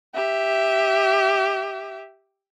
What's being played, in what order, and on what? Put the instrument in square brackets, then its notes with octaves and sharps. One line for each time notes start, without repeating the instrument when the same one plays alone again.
[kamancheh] G4 E5